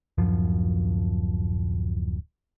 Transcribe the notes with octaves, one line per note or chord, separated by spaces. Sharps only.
D1 F#2 F3